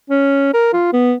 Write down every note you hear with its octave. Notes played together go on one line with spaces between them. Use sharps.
C#4
A#4
F4
B3